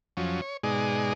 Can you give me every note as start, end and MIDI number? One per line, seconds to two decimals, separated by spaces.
0.17 0.41 41
0.17 0.41 53
0.17 0.41 54
0.17 0.41 61
0.42 0.57 73
0.63 1.13 44
0.63 1.13 47
0.63 1.13 56
0.63 1.13 63
0.63 1.13 68
0.63 1.13 74